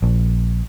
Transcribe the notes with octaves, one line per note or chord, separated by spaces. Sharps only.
A#1